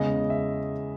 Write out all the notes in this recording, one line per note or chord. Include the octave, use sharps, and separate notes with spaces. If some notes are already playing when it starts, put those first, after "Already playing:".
Already playing: E2 C#3 G#3 D#5
E5